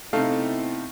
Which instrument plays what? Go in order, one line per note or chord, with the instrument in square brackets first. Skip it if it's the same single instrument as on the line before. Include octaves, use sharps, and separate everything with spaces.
[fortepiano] C3 A3 [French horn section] B3 C4 E4 [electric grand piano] D#4 A4 F5